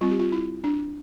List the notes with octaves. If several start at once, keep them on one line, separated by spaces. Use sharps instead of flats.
G3 C4 F4
G4
F4
E4
D4